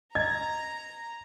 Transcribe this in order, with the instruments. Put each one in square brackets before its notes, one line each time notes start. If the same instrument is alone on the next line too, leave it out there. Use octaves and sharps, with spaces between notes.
[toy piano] D#5 [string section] A#5 [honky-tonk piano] G#6